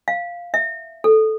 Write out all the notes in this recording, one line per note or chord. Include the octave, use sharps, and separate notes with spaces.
F5
E5
A4